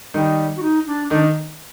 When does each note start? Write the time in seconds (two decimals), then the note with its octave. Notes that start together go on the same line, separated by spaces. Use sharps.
0.14 D#3 G3 D#4
0.56 F#4
0.63 D#4
0.87 D4
1.10 D#3 D4 D#4